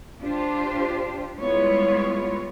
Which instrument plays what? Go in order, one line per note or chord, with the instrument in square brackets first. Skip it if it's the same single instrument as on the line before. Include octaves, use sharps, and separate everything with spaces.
[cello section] D4 F4 G4 C5
G3 G#3 B3 E4 F4 C#5